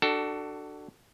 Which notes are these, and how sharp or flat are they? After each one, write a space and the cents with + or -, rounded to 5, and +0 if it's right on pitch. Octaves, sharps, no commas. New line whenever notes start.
D4 +25 F#4 +30 A4 +5